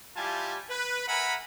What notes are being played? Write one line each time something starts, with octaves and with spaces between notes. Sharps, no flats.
G3 E4 F4 G4 G#5 A5
B4
A#4 E5 F#5 G#5 A#5 B5